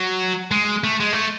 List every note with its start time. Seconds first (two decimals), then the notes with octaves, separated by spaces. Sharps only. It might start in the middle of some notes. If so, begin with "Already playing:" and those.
Already playing: F#3
0.51 G#3
0.84 A3
1.00 G#3
1.13 A3